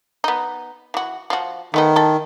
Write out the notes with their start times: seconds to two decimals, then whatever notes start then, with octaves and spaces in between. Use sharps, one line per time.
0.24 B3 D#4
0.94 E3 F#4
1.30 F3 F#4
1.74 D#3 A3 B3 D#4
1.96 E4 A4